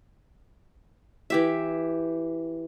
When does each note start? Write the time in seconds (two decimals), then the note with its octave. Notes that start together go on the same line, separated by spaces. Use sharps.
1.30 E3 G4 E5